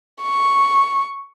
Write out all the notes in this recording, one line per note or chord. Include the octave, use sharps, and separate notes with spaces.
C#6